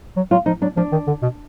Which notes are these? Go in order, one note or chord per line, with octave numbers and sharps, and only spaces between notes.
F#3
F#3 F4
F3 D#4
F#3 D4
F3 D4
D#3
D3
B2